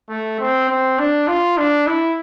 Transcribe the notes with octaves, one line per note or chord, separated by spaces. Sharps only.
A3
C4
C4
D4
F4
D4
E4